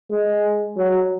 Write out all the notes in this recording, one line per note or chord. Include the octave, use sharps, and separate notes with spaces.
G#3
F#3